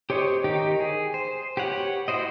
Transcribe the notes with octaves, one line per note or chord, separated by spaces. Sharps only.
G4 C5 C#5 D#5 C#6
D#3 D#4 G4
G#4
C5
G4 B4 C#5 F#5
E4 F#4 C5 D#5